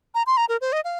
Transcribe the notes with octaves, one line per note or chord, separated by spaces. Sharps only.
A#5
C6
A#5
A#4
C5
D#5
F5